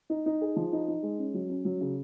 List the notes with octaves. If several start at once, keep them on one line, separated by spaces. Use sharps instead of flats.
D#4
D#4
G#4
F3
D#4
D#4
G#3
C#4
F#3
C#4
F#3
C#3